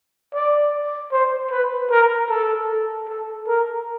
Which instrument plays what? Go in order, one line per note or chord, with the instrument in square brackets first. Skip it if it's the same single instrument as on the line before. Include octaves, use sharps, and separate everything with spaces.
[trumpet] D5
C5
B4
A#4
A4
A4
A#4